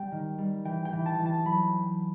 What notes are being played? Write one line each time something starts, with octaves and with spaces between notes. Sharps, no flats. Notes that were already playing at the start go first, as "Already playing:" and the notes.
Already playing: G3 G5
D#3
G3
E3 G5
G5
E3
A5
E3
A5
F#3 B5